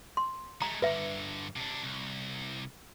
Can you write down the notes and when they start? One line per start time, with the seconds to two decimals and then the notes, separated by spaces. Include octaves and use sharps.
0.17 C6
0.62 G#3 A3 A#5
0.82 G2 D3 B4 E5
1.56 C3 D4
1.83 C2